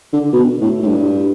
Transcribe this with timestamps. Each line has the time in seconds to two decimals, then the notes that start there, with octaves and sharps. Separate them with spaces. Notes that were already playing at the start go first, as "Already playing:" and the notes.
0.13 D3
0.33 B2
0.61 A2
0.82 A2
0.87 G2